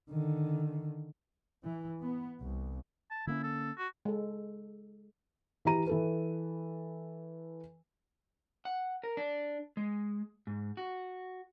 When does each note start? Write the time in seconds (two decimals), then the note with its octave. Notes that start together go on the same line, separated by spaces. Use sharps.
0.11 D3 D#3
1.64 E3
2.03 B3
2.41 C2
3.11 A5
3.27 D3 A#3 C#4 E4
3.43 A4
3.77 F#4
4.05 G#3 A4
5.65 E3 E4 G4 A#5 D#7
5.87 E3 A4 B4
8.65 F#5
9.03 A#4
9.17 D4
9.77 G#3
10.47 G#2
10.77 F#4